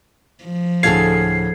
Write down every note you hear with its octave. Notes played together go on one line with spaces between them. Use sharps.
F3
D2 A2 G#4 A4 F5 G#6 C7